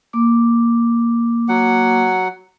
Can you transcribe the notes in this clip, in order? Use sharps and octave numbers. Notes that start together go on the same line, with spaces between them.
A#3 D6
F#3 F#5